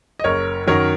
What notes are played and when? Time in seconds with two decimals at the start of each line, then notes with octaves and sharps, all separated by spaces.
0.20 D#5
0.24 F#1 A#4 C#5
0.67 F#2 D#3 F#3 A#4 C#5